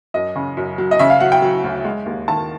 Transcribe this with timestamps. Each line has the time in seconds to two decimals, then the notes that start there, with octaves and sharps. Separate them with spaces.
0.14 F#2 D#5
0.36 C#3
0.57 F#2
0.78 F#3
0.91 D#5
0.99 C#3 E5
1.10 F5
1.20 F#3 F#5
1.32 G5
1.42 F#3
1.64 D2
1.85 G#3
2.06 D#2
2.28 D#3 A5